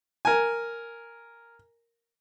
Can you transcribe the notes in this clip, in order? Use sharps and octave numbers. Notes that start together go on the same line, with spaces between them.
A#4 G#5